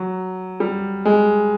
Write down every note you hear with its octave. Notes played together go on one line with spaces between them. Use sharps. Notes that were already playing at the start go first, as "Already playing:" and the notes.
Already playing: F#3
G3
G#3